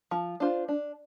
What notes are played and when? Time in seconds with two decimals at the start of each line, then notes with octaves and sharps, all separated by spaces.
0.11 F3
0.40 D4 F4 C5
0.68 D4